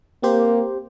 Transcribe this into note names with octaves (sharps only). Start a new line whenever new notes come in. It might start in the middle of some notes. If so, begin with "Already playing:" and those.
A#3 C4 G4 C5